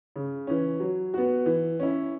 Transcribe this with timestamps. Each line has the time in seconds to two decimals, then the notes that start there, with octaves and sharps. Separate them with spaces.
0.16 C#3
0.47 E3 C#4
0.80 F#3
1.14 B3 F#4
1.46 E3
1.80 C#4 E4